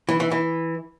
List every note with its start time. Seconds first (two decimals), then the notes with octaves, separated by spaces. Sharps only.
0.09 E3
0.20 E3
0.32 E3